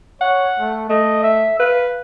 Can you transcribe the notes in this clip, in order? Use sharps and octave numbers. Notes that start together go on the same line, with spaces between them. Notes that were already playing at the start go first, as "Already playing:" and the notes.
C#5 F#5
A3
A3 D#5
E5
B4 F5